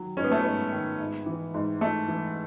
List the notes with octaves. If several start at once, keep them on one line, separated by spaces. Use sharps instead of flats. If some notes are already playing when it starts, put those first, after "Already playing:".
Already playing: D#3 F#3
G#2 C#4
B3
A3
B3
G#2
D#3
G#2
E3
G#2
G#2 A3
E3